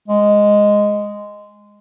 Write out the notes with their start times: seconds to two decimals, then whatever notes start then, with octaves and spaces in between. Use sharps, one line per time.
0.08 G#3